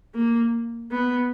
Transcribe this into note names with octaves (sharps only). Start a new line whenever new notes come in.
A#3
B3